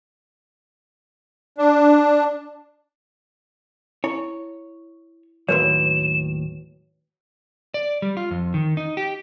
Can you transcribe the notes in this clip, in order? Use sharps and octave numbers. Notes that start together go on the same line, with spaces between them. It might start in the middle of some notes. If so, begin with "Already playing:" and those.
D4
E4 C#5
D#2 A2 F#3 F#4 B4 C#5 E7
D5
G3
F4
F2
D#3
D#4
G4